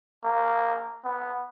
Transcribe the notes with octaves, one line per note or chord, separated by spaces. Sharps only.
A#3
B3